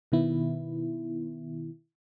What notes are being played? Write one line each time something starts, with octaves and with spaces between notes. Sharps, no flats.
B2 D#3 B3 E4